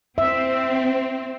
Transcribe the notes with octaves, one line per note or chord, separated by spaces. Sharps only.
C4 E5